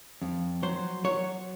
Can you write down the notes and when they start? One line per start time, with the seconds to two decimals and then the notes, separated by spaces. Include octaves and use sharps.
0.22 F2
0.63 F#3 C5
1.04 F#3 C#5